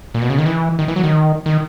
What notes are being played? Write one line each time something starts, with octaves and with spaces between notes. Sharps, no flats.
A#2
B2
C#3
D#3
E3
D#3
E3
F#3
D#3
D#3